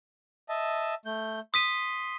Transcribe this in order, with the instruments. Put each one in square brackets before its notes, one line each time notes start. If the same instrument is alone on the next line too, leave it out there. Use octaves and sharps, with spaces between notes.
[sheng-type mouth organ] D#5 E5 A5
A3 G6
[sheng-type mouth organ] C6 [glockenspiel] D#6 B6 D#7